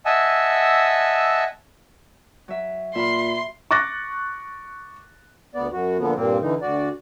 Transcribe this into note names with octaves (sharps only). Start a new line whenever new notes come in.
D#5 E5 F#5 G#5 A5 E6
F#3 E5
A#2 E5 B5 C6 F6
C#6 D6 F#6 A6 A#6
D2 B3 D5
F#2 F#4
A#2 D3 F3 B3
G2 A#2 A#3 C4
D3 E3 D#4
D2 F#4 D5